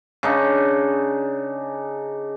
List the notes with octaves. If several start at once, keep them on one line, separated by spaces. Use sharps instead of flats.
C#3 D4 D#4